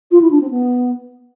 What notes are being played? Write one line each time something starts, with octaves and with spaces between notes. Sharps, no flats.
F4
E4
D4
C4
B3